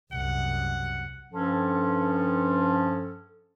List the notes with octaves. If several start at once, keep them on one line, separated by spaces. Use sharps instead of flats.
C2 F#2 F#5
G2 F3 C#4 A4